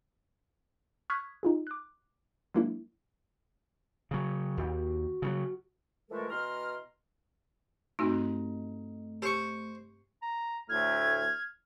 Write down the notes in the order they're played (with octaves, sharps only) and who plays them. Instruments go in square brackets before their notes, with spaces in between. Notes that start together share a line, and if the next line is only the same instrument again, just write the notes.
[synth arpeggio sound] C#6 D#6 F6 F#6 G#6 B6
D#4 F4 G#4
D6 F#6
F#3 G#3 A#3 D4 E4
[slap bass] C#3 F#3
[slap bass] D#2 [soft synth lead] F#4
[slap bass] C#3 E3 F#3
[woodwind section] E3 F3 G#3 A3 A4 A#4
B2 E3 A#5 C6 F6
[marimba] G2 C4 G#5 [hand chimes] A3 [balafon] D#4 F#4
[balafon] G4 [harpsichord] C5 C#6
[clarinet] A#5
[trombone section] D2 A2 A3 [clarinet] F6 [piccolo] G#6